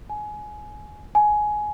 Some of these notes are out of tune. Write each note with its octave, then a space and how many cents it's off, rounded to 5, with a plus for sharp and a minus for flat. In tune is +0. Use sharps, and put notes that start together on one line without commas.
G#5 +20
G#5 +15